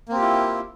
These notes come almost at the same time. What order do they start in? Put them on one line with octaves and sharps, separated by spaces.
A#3 C4 G4 F4 E4